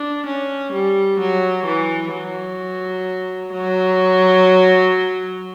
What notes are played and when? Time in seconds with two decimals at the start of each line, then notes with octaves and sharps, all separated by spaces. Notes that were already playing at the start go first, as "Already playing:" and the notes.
Already playing: D4
0.26 C#4
0.73 G3
1.19 F#3
1.66 E3
2.12 F#3
3.53 F#3